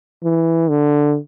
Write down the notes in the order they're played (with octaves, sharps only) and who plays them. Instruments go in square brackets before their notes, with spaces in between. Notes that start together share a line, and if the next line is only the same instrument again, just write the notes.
[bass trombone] E3
D3